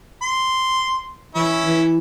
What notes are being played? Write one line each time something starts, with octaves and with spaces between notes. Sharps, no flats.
C6
E3 C#4 E4
E3